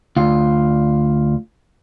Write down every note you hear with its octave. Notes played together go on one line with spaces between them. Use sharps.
D2 F4